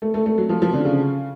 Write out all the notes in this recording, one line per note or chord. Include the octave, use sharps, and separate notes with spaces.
A3
A3
A3
F#3
F3
F3
D3
C#3